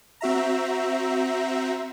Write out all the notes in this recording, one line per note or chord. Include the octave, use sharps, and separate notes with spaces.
C4 F#4 E5 A#5